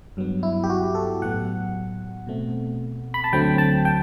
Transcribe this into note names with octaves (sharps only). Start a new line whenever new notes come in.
G2 F#3 B3
E4
G4
F#4
A4
A2 F#3 B3 F#5
B2 A3 C4
B5
A5
D2 D3 F#3 A3 C4 G5
A5
G5